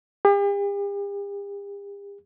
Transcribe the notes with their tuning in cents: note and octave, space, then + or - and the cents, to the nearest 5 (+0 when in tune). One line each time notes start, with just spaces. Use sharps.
G4 +45